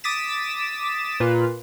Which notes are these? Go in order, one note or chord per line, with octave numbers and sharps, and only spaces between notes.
D6 D#6 A6 B6 E7
A#2 A#3 F4 B4